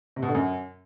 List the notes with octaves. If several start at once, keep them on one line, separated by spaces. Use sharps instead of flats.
C3
B2
D3
F#2